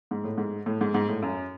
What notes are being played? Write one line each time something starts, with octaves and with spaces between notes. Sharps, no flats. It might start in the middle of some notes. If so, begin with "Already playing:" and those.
G#2
A2
G#2
A2
G#2
G#2
A2
F#2